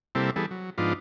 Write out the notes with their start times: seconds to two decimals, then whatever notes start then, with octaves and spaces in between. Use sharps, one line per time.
0.15 C3 G3 A#3 C4 E4 A4
0.36 E3 G3 B3 G#4 A4
0.51 F#3
0.78 G#2 F3 B3 D4 D#4 F4